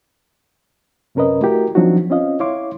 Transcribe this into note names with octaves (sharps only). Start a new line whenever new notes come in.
F#2 C3 C#4 A#4 B4 D#5
A3 E4 F#4 G4 A#4
F3 F#3 C4 D4 D#4 F#4
C4 C#4 F4 D#5 F5
E4 C#5 F5 C6 D6